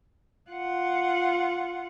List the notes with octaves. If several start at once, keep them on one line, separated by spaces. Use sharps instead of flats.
F4 F#5